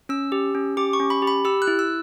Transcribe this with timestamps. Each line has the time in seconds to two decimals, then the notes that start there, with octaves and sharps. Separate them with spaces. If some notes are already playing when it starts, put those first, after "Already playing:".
0.09 C#4 E6
0.32 G4
0.55 C#4
0.77 G4 D6
0.93 C#6
1.00 C#4
1.10 B5
1.22 G4
1.27 B5
1.45 G4 E6
1.62 F#6
1.67 E4
1.79 E6